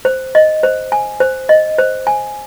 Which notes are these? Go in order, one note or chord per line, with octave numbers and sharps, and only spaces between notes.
C5
D#5
C5
G#5
C5
D#5
C5
G#5